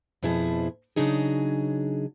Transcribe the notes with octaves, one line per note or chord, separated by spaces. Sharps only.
F2 B2 F3 E4 G#4 A5
C#3 F#3 D4 D#4 G#4